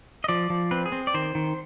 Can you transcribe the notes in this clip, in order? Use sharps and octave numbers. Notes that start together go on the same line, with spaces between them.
D#5
F3 D5
F3
C4 B4
G#4
C4
D5
D#3 C5
D#3